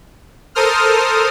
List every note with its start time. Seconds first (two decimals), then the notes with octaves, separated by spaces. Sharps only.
0.55 A4 A#4 C5 D#6 F6